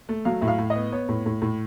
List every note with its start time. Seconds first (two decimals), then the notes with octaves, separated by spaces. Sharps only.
0.09 A3
0.25 F#3 F5
0.41 A2 E5
0.48 F5
0.59 A2
0.70 D#5
0.75 B3
0.92 B3 C#5
1.09 A2
1.26 A2
1.42 A2